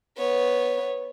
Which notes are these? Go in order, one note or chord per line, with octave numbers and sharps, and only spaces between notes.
B3 C#5